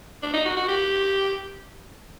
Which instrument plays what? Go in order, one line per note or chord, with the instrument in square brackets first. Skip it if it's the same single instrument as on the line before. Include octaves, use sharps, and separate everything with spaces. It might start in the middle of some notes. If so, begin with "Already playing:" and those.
[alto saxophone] D4
D#4
F#4
F#4
G4